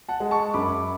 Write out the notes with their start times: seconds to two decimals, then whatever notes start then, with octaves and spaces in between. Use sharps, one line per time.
0.09 F#5 A5
0.20 G#3
0.31 A5 C#6
0.54 F#2 B5 D6